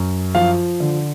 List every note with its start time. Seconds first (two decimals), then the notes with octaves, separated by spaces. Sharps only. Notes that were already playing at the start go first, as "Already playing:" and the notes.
Already playing: F#2
0.35 F3 F5
0.80 D3